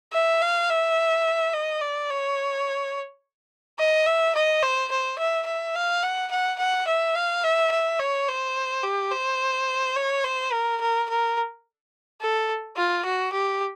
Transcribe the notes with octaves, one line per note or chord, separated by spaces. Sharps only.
E5
F5
E5
D#5
D5
C#5
D#5
E5
D#5
C5
C5
E5
E5
F5
F#5
F#5
F#5
E5
F5
E5
E5
C#5
C5
G4
C5
C#5
C5
A#4
A#4
A#4
A4
F4
F#4
G4